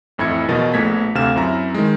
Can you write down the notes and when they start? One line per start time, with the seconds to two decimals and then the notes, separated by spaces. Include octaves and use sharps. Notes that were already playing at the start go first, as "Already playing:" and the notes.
0.18 A1 F2 E4 G#6 C#7
0.48 E2 B2 F3 A#4 D#5 A6
0.74 A#1 A3 B3 G#6 B6
1.15 D2 C3 F5 F6 E7
1.36 F#2 C4 E4 A#5
1.74 D#3 G#3